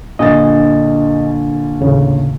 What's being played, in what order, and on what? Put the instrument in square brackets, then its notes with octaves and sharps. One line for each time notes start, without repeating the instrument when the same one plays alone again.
[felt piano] A#1 D3 A6 [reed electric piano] D#5 G#5
[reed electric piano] D#2 A2 C#3